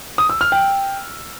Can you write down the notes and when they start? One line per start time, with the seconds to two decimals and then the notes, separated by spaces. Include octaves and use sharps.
0.18 D#6
0.29 E6
0.41 F6
0.52 G5